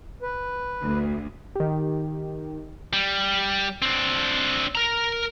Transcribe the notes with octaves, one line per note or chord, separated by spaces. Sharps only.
B4
D2
D#3 G4
G3
C4 D4
A#4 A#5